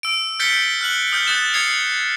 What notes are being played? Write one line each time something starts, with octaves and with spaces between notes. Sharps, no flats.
E6 D7
F6 G6 A6 B6 C#7 G7
F6 F#6 F#7
D#6 F6 G6
D#6 F#6 A6 E7
D#6 G#6 C7 C#7 F7